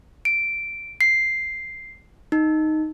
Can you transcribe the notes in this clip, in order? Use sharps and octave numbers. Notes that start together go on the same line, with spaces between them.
D7
C7
D#4